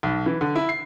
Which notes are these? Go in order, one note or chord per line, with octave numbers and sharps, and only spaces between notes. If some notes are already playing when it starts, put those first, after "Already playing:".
B1
E3
D3
E4
C7